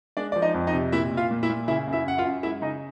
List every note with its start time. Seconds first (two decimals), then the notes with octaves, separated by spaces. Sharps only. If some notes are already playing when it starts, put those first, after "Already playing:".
0.17 G#3 D4 D5
0.32 F3 D5
0.42 D#4 D#5
0.54 F2
0.67 D#4 D#5
0.73 C3
0.92 A#2 E4 E5
1.11 A#2
1.17 F4 F5
1.31 A#2
1.43 E4 E5
1.49 A#2
1.67 C#3 E4 E5
1.87 F#2
1.93 E4 E5
2.06 F#2 F#5
2.18 F4 F5
2.25 F#2
2.43 G#3 E4 E5
2.62 C#3 D#4 D#5